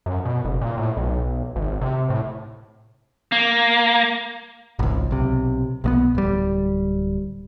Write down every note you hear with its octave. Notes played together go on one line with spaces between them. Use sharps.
F#2
B2
F#1
A#2
A2
B1
G#1
C3
A2
A#3
G#1 C#2
B1 C3
B1 G#3 B3
D1 G3